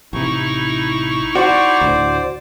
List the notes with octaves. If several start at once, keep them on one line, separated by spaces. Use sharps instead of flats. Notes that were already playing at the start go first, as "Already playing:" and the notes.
A1 C3 D#4 E4 C#6
F#4 C5 D5
D2 A2